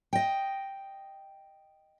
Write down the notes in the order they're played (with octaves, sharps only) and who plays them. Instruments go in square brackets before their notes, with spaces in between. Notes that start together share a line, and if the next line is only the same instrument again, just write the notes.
[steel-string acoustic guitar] D#5 G5